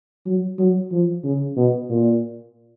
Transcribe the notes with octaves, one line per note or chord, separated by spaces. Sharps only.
F#3
F#3
F3
C#3
B2
A#2